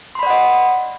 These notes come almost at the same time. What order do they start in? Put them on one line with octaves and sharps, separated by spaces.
C6 B5 D5 F#5 D#5